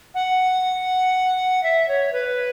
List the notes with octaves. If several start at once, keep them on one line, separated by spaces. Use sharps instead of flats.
F#5
E5
C#5
B4